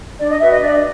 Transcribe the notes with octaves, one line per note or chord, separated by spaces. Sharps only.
D4 D5
D#5
F#4 B4 E5
D#5
D4 D5